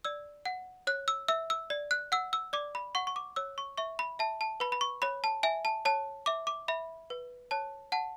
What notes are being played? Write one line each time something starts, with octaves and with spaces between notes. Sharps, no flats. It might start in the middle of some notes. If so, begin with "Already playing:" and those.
D5 E6
F#5
C#5 F#6
E6
E5 E6
E6
D5
F#6
F#5 E6
E6
D5 D6
B5
F#5 C#6
C#6
D6
C#5 E6
C#6
E5 C#6
B5
E5 A5
A5
B4 B5
B5
C#6
C#5 B5
A5
E5 G#5
A5
C#5 A5
E5 D6
D6
E5 B5
B4
C#5 A5
F#5 A5